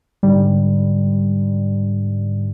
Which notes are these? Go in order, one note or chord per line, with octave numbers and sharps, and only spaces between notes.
G#2 D3 G3